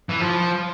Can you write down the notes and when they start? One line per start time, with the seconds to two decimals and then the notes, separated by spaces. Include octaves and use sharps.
0.09 E3
0.20 F3